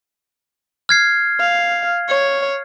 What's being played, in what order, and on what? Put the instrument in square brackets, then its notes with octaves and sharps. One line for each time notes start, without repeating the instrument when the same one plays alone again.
[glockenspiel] F6 G#6 C7
[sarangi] F5
C#5